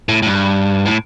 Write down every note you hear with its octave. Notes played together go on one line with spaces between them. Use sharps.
A2
A2
G2
A2